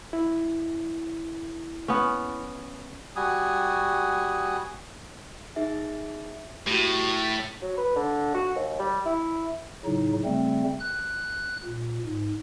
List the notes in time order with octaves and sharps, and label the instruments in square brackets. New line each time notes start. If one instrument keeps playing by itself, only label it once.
[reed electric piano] E4
[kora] B3 C#4
[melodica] G3 F#4 G#5 D#6
[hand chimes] D#4 G#4 E5
[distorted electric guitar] A2 [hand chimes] F#4 G4
[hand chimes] A6 B6
[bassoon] F#3
B4
D3
F#4
D#2
G3
E4
[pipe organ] A2 C#3 F#3 D#4
C#3 G3 A3 C4
F#6
A#2
G#2